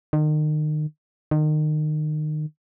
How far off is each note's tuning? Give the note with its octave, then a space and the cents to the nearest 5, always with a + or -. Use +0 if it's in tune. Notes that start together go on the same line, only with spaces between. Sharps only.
D#3 -35
D#3 -30